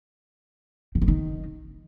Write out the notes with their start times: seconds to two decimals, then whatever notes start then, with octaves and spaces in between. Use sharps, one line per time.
0.95 D#3
1.02 E3
1.08 D#3